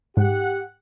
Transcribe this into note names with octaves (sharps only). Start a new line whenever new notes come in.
G#2 G4 F#5